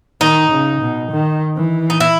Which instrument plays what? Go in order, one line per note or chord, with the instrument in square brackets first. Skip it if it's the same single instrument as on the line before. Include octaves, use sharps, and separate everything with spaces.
[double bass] D#3 [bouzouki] D#4
[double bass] C#3
B2
D#3
E3
[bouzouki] D#4
E4